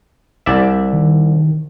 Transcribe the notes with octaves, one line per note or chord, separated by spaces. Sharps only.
C2 D5 E5
D#3